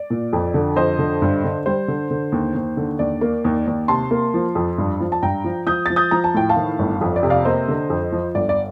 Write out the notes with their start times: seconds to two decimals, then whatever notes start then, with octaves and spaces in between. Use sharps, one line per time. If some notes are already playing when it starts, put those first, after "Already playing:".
Already playing: D5
0.10 A#2
0.33 F2
0.54 D3
0.76 F2 C5 D#5
0.99 D3
1.22 G2
1.44 D3
1.66 G3 C5
1.88 D3
2.11 D3
2.32 D#2
2.55 D#2
2.77 D3
2.99 D#2 D5
3.21 A#3
3.45 D#2
3.67 D#2
3.88 C3 A5 C6
4.11 A#3
4.34 F3
4.55 F2
4.78 G2
5.00 F3
5.12 A5
5.22 G2 G5 A#5
5.44 F3
5.67 F3 D#6 G6
5.86 F3 A6
5.96 D#6 G6
6.11 F3 A#5
6.24 A5
6.34 A2 G5
6.49 F5 A5
6.56 D#3
6.79 G1
7.01 F2
7.16 D5
7.23 C3
7.30 D5 F5
7.45 A#3 C5 D#5
7.68 D3
7.90 F2
8.12 F3
8.35 G1 D5
8.49 D5